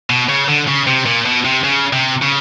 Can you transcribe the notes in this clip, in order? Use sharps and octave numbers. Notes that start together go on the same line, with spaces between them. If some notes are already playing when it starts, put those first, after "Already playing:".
B2
C#3
D3
C#3
C3
A#2
B2
C3
C#3
C3
C#3